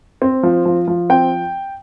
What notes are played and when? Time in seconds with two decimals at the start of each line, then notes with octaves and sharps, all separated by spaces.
0.22 C4
0.43 F3
0.66 F3
0.88 F3
1.10 C4 G5